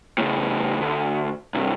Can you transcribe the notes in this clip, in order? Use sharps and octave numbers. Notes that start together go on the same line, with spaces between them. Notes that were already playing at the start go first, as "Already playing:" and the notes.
A2 C#3
D2
C2 G2